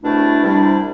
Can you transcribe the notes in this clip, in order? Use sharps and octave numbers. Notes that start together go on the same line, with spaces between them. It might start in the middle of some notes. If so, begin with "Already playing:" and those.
C2 B2 A3 D4 E4
C2 C3 G3 D4